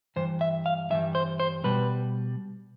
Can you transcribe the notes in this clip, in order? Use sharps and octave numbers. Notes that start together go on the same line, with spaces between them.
G2 E3 C5
E5
F5
G2 E3 G3 E5
C5
C5
B2 G3 B4